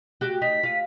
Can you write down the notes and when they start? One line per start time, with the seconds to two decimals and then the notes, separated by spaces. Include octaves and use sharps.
0.21 F#4 G4
0.42 D#4 B6
0.63 F4